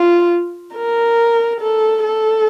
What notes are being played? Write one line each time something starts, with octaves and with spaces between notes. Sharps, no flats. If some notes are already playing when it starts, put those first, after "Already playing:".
Already playing: F4
A#4
A4
A4